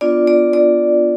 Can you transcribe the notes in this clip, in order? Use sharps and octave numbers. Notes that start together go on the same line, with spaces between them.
B3 D4 F4 D5
D5
D5